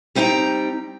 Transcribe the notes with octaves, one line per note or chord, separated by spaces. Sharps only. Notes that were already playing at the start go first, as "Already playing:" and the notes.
G3 C4 D#4 F5 G5 A#5